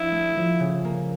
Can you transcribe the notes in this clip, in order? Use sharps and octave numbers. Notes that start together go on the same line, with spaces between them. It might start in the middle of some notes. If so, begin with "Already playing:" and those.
Already playing: F3 D4 E4 F4
A3
F3
C#3
A#3